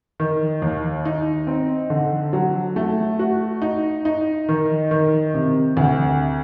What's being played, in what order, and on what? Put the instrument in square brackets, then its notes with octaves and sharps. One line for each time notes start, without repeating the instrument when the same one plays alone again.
[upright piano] D#3
D#2
D#4
C4
D3
F#3
A3
F#4
D#4
D#4
D#3
D#3
C3
D2